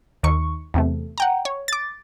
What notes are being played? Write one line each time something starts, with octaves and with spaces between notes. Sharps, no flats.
D#2 D#3 C#6
E2 C3 A3
F#5 G5 A#5
C#5
D6 A6